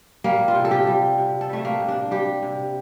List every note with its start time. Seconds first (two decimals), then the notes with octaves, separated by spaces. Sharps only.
0.24 G3 A#3
0.48 F4
0.55 C3
0.65 A4
0.71 G4
0.87 G3
1.18 C3
1.41 A4
1.49 G3 A3
1.65 A#3
1.80 C3
1.88 D4
2.11 G3 G4
2.43 C3